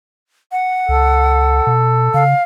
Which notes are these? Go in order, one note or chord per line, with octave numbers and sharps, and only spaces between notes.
F#5
C#2 A4
B2
C#3 F5